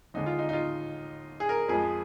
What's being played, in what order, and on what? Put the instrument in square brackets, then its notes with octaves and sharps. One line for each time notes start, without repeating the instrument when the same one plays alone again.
[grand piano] D#2 D3 G#3 D#4
F4
D#4
D#4
F4
G#4
A#4
F2 F3 G#3 G#4